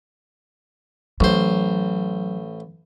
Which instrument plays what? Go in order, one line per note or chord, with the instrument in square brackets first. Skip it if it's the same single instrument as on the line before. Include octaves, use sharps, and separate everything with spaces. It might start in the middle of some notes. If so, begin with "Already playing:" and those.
[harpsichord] A1 C5 [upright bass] F#3